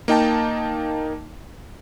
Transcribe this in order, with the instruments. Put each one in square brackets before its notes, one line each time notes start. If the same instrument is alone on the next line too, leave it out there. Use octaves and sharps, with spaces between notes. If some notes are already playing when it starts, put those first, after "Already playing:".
[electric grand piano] A#3 D#4 G5 A5